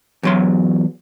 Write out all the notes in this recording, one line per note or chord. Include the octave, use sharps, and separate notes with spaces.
E2 F#3 C6